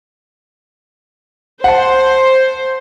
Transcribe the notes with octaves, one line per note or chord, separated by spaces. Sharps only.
C5 F#5 A5